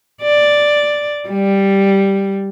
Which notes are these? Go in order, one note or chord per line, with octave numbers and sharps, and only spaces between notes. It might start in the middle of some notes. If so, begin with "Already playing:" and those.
D5
G3